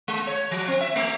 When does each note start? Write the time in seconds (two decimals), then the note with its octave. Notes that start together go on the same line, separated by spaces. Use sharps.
0.08 G#3
0.27 C#5
0.51 F3
0.68 C4
0.81 E5
0.96 A3